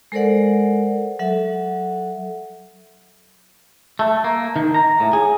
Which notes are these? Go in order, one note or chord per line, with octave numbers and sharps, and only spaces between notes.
G#3 A4 A#4 C5 D5 F#5
F#3 A4 E5 F#5
A3
A#3
D#3
A#5
A2
G#4